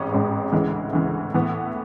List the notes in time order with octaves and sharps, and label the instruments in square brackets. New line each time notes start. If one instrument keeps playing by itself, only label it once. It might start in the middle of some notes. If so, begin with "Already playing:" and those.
Already playing: [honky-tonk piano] A1 G#2 G#3 C#4
A1 G#2 G#3 C#4
D2 C#3 E3 G#3
D2 C#3 E3 G#3
A2 E3 B3